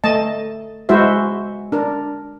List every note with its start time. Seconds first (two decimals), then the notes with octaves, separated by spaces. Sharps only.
0.04 A3 D#5 A5
0.89 G#3 E4 F#4 C5 E5
1.72 D4 A#4